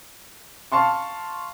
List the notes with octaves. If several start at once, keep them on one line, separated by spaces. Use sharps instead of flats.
F5 A5 C6 C#6